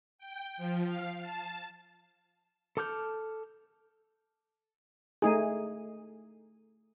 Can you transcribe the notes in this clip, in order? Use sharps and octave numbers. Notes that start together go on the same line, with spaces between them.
G5
F3
F5
A5
A4 A5 D6 F6 G6
A3 D#4 G#4